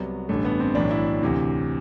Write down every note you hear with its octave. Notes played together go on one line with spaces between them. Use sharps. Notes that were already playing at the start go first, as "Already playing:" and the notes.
Already playing: C2 C3 F#3 B3
A1 G2 D3 A3
B3
C4
B1 A2 E3 D4
E4
D2 C3 E3